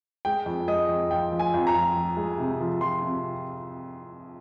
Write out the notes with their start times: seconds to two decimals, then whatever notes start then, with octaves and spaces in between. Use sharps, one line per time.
0.25 G#3 G5
0.46 F2
0.68 G#3 D#5
0.88 F2
1.10 F3 G5
1.32 F3
1.39 G#5
1.54 F2
1.67 A#5
1.75 F3
1.96 F3
2.17 G#3
2.38 C3
2.60 F3
2.81 F3 C6
3.03 C3